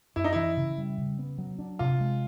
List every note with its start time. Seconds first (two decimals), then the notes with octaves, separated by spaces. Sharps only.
0.16 F#2 E4
0.24 D#4
0.33 E3 E4
0.57 C#3
0.78 G3
0.98 C#3
1.19 B3
1.38 F#3
1.59 D4
1.79 C3 F4
2.01 G#3